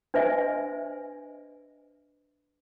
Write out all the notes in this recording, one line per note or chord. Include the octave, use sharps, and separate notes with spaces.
D4 B4 C5 D#5 E5 G#5